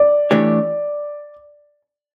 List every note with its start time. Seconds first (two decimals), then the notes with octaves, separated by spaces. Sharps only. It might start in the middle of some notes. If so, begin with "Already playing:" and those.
Already playing: D5
0.31 E3 A3 D4 G4 C#5